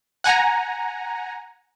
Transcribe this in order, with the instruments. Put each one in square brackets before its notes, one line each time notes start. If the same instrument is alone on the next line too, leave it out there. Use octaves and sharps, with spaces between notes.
[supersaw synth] F#5 G#5 A#5